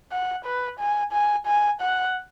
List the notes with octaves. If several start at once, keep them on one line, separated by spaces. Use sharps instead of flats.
F#5
B4
G#5
G#5
G#5
F#5